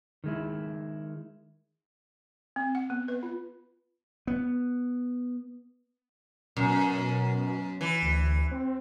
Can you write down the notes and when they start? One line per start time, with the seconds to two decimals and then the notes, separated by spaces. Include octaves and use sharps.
0.24 D#3 G#3 E4
2.56 C4
2.75 F#5
2.90 B3
3.08 B4
3.23 F4
4.27 B3
6.57 F#2 B2
7.81 E3
8.02 D2
8.51 C4